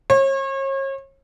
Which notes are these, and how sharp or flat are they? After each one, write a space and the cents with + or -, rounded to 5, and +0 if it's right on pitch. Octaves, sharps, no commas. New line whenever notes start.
C#5 -40